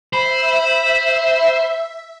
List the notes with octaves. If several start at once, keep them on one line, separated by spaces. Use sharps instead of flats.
C5 E5 B5